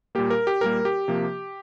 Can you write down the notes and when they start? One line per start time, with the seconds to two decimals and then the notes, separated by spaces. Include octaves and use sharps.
0.15 A#2 G3 A#3 G4
0.30 A#4
0.47 G4
0.61 A#2 G3 A#3 A#4
0.85 G4
1.08 C3 F3 A#3